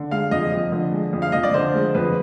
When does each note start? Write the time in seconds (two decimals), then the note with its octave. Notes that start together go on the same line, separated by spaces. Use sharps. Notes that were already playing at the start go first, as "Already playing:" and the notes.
Already playing: D3
0.11 G#3 F5
0.31 F2 D#5
0.52 F2
0.72 D3
0.92 G#3
1.13 F2
1.22 F5
1.32 F2 D#5
1.43 D5
1.54 D3 C5
1.74 G#3
1.94 F2 B4